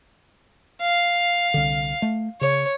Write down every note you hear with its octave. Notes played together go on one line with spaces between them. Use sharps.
F5
C2 D3
A3
C#3 C#5